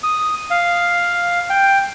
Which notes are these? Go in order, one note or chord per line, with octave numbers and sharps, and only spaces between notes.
D#6
F5
G5